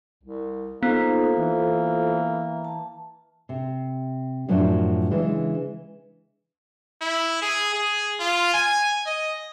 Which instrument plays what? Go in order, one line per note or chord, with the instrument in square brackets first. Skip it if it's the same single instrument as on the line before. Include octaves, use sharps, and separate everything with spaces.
[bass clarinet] C2
[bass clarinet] A#3 [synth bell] B3 [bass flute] D#4 [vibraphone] F4 A4 C5
[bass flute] E3
[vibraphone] A5
[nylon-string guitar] C3
F#2 A2 F3 F#3 D4
C#3 E3 G#3 D4
[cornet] E4
G#4
G#4
F4
G#5
D#5